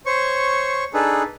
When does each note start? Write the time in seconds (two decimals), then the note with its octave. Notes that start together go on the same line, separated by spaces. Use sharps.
0.06 C5 C#5 C#6
0.94 D4 D#4 G#4 A4 B4